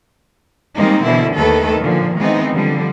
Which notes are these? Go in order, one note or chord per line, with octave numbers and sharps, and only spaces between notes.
D#3 G3 G#3 A#3 C4 D#4
B2 D3 E3 E4
D#2 D#3 A3 A4 B4
A#2 D3 F3
D#3 E3 G#3 B3 C4 D#4
D3 F3 G3